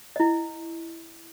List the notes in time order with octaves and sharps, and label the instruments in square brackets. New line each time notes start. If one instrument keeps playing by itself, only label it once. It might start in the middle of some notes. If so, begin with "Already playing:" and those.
[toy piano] E4 D#5